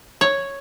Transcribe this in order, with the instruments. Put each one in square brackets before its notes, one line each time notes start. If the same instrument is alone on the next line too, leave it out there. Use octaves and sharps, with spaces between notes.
[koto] C#5